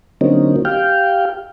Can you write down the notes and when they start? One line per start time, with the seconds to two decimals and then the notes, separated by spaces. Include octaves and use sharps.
0.21 D3 F#3 A#3 C4 C#4 D#4
0.65 G4 F5 G5